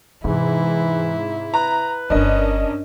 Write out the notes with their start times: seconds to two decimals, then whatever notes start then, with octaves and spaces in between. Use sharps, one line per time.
0.24 G#2 C3 E3 E4
1.54 B4 A#5
2.10 D1 G1 C#4 D4 A#4 D#5